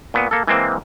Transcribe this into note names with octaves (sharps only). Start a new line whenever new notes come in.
A#2 B3
A#3 A4
E3 G#3 A#3 C4